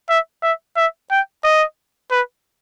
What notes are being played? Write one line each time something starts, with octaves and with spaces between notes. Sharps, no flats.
E5
E5
E5
G5
D#5
B4